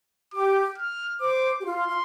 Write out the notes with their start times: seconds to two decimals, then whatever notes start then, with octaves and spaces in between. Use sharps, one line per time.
0.34 G4 D6
0.78 F6
1.21 C5 D6
1.59 G4
1.64 F4 C6
1.87 F4